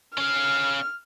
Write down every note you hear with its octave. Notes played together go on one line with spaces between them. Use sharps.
C#4 F5 F6